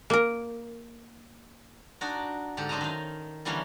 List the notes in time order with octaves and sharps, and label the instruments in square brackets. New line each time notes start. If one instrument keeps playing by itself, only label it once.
[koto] A#3 A#4
[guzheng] D4 D#4 F#4 D5
G#2 D3 G4 A4
F#2 D4 C5 D#5 A5 A#5
D#3 F5
D3 E3 G3 A#3 C#4